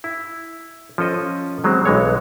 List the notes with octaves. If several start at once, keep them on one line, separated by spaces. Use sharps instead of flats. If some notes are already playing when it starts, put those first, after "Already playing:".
E4
F3 C#4 A4 D#5
E3 F#3 G#3 C4
B1 E3 G#3 C#5